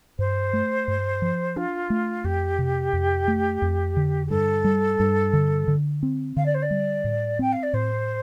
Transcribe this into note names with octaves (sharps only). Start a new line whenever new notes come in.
G2 C5
A3
G2
F3
D4 F4
A3
F2 G4
C3
F2
A3
F2
D3
G4
G2 A4
G3
G2
D3
D3
C4
D3 F5
D5
C5
D5
G3
A2
C4 G5
F5
D5
A2 C5